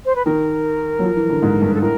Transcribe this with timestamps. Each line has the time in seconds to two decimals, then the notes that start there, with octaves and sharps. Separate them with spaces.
0.05 C5
0.15 B4
0.25 D#3 A#4
0.99 F#3
1.03 F3
1.16 E3
1.29 D3
1.42 G#2
1.62 G2
1.74 A4
1.81 A2 A#4